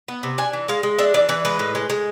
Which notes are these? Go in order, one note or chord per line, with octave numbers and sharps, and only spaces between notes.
B3
C3
D4 G#5
E3
G#3 F5
G#3
D4 E5
E3 D5
E3 B4
G#3 B4
A2
G#3
G#3